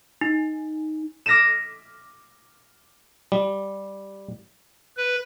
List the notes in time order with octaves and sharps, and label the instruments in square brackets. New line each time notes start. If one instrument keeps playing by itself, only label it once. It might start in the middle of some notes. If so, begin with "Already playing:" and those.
[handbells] D#4
[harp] D6 F6 A#6 B6 D#7 E7
[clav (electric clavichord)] G3
[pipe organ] B4